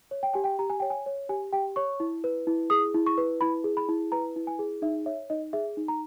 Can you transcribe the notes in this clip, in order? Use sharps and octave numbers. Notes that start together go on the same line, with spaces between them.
C#5
G5
G4 G#5
G5
G4 A#5
G#5
C#5 G5
G#5
C#5
G4 G#5
G4 G5
C#5 C#6
E4
B4
E4
G#4 D#6
E4
C#6
B4
E4 B5
G#4
B5
E4
B4 A#5
E4
G#5
G#4
D#4 E5
C#5 E5
D#4 D#5
G#4 E5
D#4
A#5